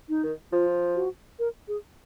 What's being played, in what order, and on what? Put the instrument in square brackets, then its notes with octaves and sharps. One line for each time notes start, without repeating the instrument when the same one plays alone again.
[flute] D#4
[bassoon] D#3
[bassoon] F3 [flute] F4
[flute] F#4
A#4
G#4